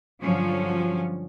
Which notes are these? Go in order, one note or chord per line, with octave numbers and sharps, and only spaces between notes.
G2 D3 F3 F#3 C#4